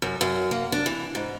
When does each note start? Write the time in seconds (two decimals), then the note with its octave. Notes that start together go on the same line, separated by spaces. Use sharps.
0.02 F#2
0.21 F#2
0.51 A#3
0.72 D4
0.86 E3
1.15 G#2